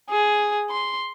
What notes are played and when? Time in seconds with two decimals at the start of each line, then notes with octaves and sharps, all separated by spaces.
0.10 G#4
0.71 C6